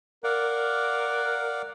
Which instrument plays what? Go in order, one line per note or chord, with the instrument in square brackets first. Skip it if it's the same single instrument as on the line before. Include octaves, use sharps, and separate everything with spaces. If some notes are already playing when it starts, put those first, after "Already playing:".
[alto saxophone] A#4 [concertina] D5 F5 F#5